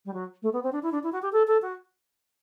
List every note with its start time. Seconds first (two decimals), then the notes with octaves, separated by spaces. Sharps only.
0.05 G3
0.13 F#3
0.42 A3
0.53 B3
0.63 C4
0.72 D4
0.83 E4
0.92 D4
1.03 E4
1.12 F#4
1.22 G4
1.32 A4
1.47 A4
1.62 F#4